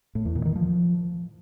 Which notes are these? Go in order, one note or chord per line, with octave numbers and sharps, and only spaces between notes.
A2
E2
A#2
D#3
F3